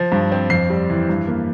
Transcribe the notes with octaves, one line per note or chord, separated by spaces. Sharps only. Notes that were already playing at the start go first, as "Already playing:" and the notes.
Already playing: F3
G2
C4
F2 C7
G3
E3
G2
A#3